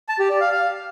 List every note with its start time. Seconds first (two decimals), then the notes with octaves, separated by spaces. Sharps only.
0.09 A5
0.19 G4
0.30 D5
0.40 F5
0.51 F5